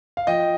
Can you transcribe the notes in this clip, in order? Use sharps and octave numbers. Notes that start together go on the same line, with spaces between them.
F5
F3 D#5 G5